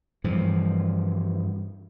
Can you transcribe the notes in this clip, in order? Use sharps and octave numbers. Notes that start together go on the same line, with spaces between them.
G2 E3 F3